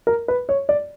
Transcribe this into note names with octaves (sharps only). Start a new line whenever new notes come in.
A#4
B4
C#5
D5